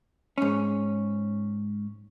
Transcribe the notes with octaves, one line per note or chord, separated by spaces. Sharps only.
G#2 C#4